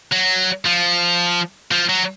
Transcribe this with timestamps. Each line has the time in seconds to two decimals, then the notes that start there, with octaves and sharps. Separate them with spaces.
0.13 F#3
0.65 F3
1.72 F3
1.89 F#3